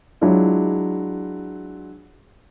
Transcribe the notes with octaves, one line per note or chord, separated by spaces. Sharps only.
F#3 G#3 D4 E4 F4